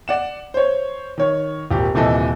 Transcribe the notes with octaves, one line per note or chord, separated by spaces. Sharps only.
D5 F#5 E7
C5 C#5
D#3 C#5
G#1 A#2 G4
D#1 C3 E3 A4 D#5